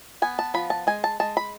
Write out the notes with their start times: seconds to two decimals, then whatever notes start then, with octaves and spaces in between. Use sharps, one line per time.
0.22 B3 G#5
0.39 A5
0.54 F3 B5
0.70 A5
0.87 G#3 G#5
1.04 A5
1.20 G#3 A5
1.37 B5